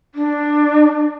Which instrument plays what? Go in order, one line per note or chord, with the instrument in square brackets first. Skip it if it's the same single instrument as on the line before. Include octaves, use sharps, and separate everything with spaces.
[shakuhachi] D4